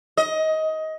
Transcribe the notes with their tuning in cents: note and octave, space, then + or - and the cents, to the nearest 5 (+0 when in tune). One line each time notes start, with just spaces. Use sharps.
D#5 +20